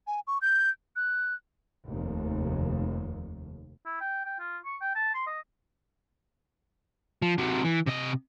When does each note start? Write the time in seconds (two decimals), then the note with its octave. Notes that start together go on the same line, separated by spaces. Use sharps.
0.07 G#5
0.27 C#6
0.41 G6
0.96 F#6
1.88 F1 D#2
3.86 E4
4.01 G5
4.25 G5
4.40 F4
4.65 C#6
4.81 G5
4.95 A5
5.14 C6
5.27 D#5
7.22 F3
7.38 C3 F#3
7.64 E3
7.86 C3 D#5